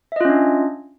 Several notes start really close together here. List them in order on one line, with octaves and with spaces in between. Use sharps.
E5 D#5 F4 C#4 D4